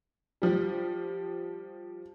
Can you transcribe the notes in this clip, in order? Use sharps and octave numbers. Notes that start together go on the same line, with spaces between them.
F3 G3